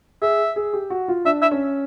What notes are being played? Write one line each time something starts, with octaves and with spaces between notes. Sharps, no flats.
G#4 E5
G#4
G4
F#4
F4
D4 E5
E5
C#4